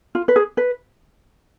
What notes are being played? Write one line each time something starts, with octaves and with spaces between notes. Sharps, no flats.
F4
B4
G#4
B4